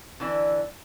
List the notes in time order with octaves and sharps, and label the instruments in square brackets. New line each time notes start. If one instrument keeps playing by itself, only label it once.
[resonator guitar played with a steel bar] D3 E3 D4